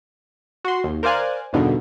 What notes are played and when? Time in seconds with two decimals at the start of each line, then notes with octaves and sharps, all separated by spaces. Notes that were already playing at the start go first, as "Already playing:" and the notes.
0.65 F#4 C6
0.84 D#2
1.03 A#4 C5 D5 F5 G#5 F#6
1.53 E2 G2 B2 D3 D#3